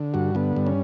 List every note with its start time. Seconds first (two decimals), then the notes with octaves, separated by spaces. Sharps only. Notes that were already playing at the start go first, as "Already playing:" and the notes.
Already playing: D3
0.14 G2 F#4
0.35 D3 B3
0.56 G2
0.67 C#4